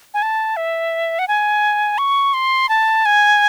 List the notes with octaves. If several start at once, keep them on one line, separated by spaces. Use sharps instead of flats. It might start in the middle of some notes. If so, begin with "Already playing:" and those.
G#5
A5
E5
F#5
G#5
C#6
C6
A5
G#5